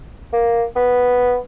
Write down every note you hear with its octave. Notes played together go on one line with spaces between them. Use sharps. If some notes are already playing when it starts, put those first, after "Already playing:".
A#3
B3